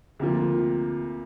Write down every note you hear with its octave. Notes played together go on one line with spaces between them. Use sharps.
D2 C3 F3 A#3 F4